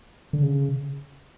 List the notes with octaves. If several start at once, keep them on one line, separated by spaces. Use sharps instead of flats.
D3
C#3